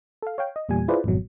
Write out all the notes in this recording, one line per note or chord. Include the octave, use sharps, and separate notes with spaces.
A4 F5
C#5 F5 G5
D#5
E2 A#2 G3 G#5
E4 F4 G#4 B4 C5 D5
G#1 F2 B2 F#3